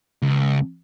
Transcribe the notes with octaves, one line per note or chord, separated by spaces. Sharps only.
C#2